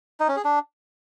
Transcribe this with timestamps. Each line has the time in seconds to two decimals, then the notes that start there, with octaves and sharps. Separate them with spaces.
0.20 D#4
0.28 C#4
0.36 G#4
0.45 D4